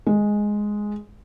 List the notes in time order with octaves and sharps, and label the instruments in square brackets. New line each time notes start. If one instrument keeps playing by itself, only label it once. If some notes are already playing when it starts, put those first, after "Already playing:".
[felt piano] G#3